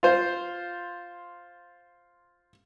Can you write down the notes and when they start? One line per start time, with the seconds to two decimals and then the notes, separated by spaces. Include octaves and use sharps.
0.03 F4 C5